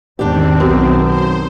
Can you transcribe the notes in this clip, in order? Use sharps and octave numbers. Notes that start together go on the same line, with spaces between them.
E2 G#2 D#3 C4 D4 G4
B1 F#2 B3
C5